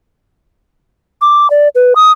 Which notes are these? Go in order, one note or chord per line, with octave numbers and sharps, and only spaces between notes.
D6
D5
B4
D#6